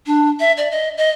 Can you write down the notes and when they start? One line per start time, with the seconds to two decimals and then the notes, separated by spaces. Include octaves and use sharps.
0.06 D4
0.40 E5
0.57 D5
0.71 D#5
0.97 D#5